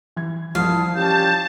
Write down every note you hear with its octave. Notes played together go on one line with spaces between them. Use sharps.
E3 G#6
C2 F3 E4 F5 A5 D#6
C#4 G4 A5 G6